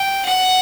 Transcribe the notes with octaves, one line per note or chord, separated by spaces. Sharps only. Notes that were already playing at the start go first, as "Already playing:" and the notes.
Already playing: G5
F#5